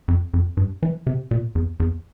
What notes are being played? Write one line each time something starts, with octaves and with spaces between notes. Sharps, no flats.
F2
F2
G2
E3
C3
A#2
E2
E2